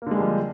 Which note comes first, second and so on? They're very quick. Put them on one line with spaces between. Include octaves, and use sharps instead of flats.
A#3 D3 G#3 G3 F3